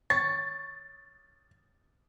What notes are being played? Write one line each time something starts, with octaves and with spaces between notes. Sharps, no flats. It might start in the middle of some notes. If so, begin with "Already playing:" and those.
C#5 A6